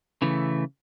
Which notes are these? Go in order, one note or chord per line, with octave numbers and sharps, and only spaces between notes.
C#3 E3 A3